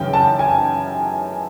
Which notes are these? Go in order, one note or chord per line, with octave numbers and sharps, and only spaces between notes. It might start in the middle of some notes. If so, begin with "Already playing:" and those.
Already playing: F#2 C#3 E3 G5
A5
G#5